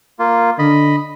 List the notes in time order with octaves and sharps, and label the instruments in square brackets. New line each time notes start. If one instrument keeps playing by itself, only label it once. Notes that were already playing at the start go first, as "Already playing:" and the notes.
[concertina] A#3 F4
[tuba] D3 [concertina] D#5 B5